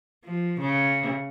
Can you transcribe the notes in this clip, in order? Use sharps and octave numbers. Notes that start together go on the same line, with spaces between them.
F3
C#3